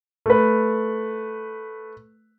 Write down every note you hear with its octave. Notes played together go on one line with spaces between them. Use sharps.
A3 B4